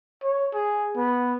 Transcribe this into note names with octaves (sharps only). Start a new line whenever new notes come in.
C#5
G#4
B3